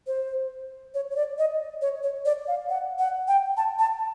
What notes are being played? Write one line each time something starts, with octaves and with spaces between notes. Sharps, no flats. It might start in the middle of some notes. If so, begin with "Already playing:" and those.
C5
C#5
C#5
D5
D#5
C#5
C#5
D5
F5
F#5
F#5
G5
A5
A5